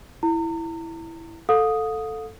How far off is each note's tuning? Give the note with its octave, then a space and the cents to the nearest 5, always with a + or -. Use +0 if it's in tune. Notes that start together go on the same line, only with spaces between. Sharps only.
E4 +0 A#5 -40
A4 +0 F5 +40 D#6 +0